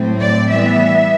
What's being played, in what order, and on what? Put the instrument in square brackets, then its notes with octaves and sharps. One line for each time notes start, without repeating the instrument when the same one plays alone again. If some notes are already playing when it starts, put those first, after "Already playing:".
Already playing: [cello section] A2 F#3 A3 C4
D5
E3 G3 B3 E5